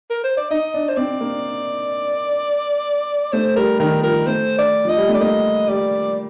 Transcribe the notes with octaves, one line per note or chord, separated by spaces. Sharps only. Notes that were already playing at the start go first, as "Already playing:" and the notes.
A#4
C5
D5
D#4 D#5
D4
C5
C4 D5
A#3
A3 C5
G3 A#4
D#3 A#4
F3 A#4
A3 C5
D5
F3 D#5
G3
A3
D5
A#3 D#5
G3 D5